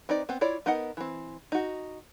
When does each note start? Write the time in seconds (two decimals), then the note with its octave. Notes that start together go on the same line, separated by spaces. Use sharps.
0.09 C4 D#4 B4 D5
0.29 B3 C4
0.41 E4 F4 C#5 D5
0.66 B3 D#4 A#4 D#5 F#5
0.97 E3 C4
1.52 D#4 F#4